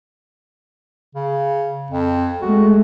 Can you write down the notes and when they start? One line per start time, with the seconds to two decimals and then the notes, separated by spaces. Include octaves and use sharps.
1.15 C#3
1.91 F2
2.42 G#3 A3 F#4